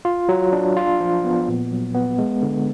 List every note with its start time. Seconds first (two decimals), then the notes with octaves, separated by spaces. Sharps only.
0.05 F4
0.29 F#3
0.52 D4
0.76 F4
1.00 F3
1.25 B3
1.48 A#2
1.72 F#3
1.94 B3
2.19 G#3
2.42 D3